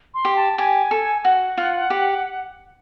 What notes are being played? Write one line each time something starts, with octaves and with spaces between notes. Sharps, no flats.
C6
G4
A5
G4 G#5
A4
F#4 F#5
F4
G4